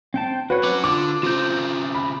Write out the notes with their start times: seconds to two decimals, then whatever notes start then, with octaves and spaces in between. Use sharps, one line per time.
0.14 C4 G5 A5
0.50 F#4 B4 C#5
0.64 C#4 F#4 D6
0.84 D3 F4 D6
1.23 C#3 C4 F4 G6
1.95 B5